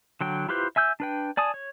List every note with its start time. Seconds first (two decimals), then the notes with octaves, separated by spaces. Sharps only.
0.21 D3 F#3 G5
0.49 E4 F4 G4 B4 C5
0.76 E5 G#5 E6 G6
1.00 D4 B4 G5
1.37 D5 G#5 A5 D#6
1.54 C#5